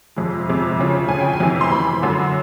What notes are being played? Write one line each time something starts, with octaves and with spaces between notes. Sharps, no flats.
F2 C3 F3 G#3
F2 C3 F3 G#3
D2 C#3 F3
D2 C#3 F3 G#5
G5
G#5
F2 C3 E3
C6
F2 C3 E3 B5
F#2 D3 F#3